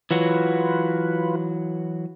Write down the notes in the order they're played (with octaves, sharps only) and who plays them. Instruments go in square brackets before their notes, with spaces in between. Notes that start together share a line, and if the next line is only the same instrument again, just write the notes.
[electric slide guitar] E3 F#3 F#4 [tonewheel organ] F4 B4